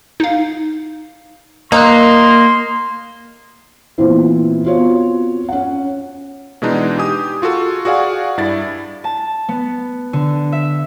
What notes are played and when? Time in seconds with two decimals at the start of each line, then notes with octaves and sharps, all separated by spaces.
0.20 D#4 F5
1.72 A#3 D#4 A#5 C6 E6 F#6
3.98 A#2 E3 B3 C4 E4 C5
4.65 B3 C4 F4 F#4 C#5
5.49 C#4 F#5
6.62 B2 E3 G#3 D4 D#4
6.98 G4 G#5 D#6
7.42 F4 F#4 G#4 A4
7.85 F#4 G#4 D5 F5 F#5 G#5
8.38 G2 E4 D5 A6
9.04 A5
9.49 B3
10.13 D3
10.52 E5